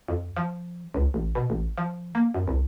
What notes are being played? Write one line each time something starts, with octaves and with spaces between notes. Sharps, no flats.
F2
F3
C#2
A1
B2
A1
F3
A#3
F#2
C2